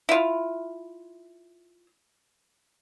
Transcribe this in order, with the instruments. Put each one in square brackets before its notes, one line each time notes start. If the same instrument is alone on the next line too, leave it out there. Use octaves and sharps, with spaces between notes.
[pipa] E4 F4